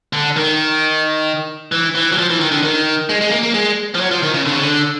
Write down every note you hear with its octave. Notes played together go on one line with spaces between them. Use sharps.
D3
D#3
E3
E3
F#3
F3
E3
D#3
D3
D#3
G#3
G#3
A#3
A#3
G#3
F3
F#3
F3
D#3
C#3
D3
C#3
D3